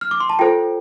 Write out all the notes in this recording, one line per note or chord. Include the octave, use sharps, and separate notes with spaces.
F6
D6
C6
A5
F4 A4 C5 G5